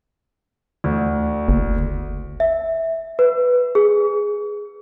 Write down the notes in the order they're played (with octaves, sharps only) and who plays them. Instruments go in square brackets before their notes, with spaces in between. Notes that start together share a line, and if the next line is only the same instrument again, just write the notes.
[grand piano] D2
[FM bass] F#1
[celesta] E5
B4
G#4